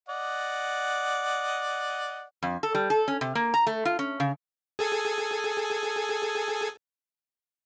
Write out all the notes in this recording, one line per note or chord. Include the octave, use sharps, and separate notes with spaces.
D5 D#5 F#5
F2
A4
G3
A4
C#4
C3
A#3
A#5
A3
F4
C#4
C#3
G#4 A4 G#5